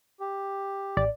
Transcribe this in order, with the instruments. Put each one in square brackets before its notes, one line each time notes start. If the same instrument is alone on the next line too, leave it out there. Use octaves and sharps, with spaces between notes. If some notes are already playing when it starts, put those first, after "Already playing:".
[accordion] G4
[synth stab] A1 D5